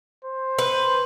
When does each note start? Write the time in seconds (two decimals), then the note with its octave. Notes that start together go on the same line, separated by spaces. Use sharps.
0.24 C5
0.58 B4